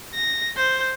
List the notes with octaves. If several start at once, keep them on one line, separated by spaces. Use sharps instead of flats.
A#6
C5 G6